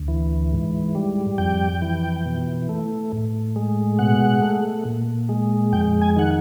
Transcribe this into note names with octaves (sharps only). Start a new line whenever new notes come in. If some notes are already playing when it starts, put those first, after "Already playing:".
Already playing: D2
E3
G#2
G3
F2 G5
E3
B2
A3
A2
G#3
B2 F#5
A3
A#2
G#3
F2 G5
G#5
D#3 F#5